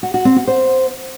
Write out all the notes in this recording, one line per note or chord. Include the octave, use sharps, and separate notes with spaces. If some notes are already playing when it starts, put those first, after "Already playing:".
F#4
F#4
C4
F#4
C5